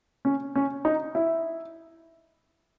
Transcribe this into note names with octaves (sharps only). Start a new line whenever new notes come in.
C#4
C#4
D#4
E4